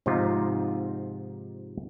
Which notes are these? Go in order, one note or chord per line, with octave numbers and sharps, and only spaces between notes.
G#2 C3 F3 D#4 F4